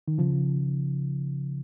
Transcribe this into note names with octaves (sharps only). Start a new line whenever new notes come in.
D#3
C#3 F3